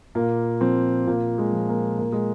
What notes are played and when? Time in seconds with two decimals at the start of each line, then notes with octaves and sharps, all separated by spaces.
0.15 A#2 A#3
0.61 F3 C4
1.06 A#2 A#3
1.38 G#3
1.52 F3
1.69 A#3
1.98 A#2 A#3
2.12 G#3